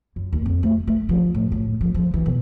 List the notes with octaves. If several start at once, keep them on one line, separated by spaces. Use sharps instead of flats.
F#2
D#2
F2
A3
A3
F3
A2
A2
F3
F3
E3
B2